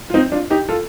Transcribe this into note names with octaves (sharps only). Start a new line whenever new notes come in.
F4
C4 D#4
D4 F4
D#4 G4
F4 A4